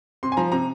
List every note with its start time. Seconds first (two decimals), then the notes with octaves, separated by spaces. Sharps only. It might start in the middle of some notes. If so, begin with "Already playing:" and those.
0.23 C3 C6
0.32 G#5
0.37 F3 A#5
0.52 C3 A#5